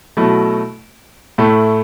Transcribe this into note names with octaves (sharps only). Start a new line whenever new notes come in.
B2 F#3 A3 E4
A2 A3 E4